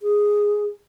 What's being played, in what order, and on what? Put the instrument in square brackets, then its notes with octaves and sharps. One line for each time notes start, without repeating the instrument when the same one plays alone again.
[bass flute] G#4